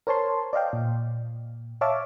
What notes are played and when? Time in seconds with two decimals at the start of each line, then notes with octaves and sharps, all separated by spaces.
0.07 A#4 C5 C#5 A5 C6
0.53 D5 D#5 F5 G5
0.73 A#2
1.81 C#5 E5 F5 A5 D6